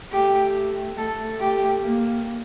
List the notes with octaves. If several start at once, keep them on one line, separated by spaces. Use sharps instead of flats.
A3 G4
A3 A4
G4
A#3